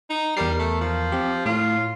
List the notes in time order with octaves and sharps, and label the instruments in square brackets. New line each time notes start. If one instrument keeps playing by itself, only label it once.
[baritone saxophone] D#4
[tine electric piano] E2 A#4 C7 [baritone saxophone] G3
[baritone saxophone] A3
F3
[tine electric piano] C4 G4
[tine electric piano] A2 [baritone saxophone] F4